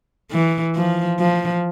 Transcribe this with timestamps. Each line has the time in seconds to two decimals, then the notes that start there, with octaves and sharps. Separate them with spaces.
0.31 E3
0.75 F3
1.19 F3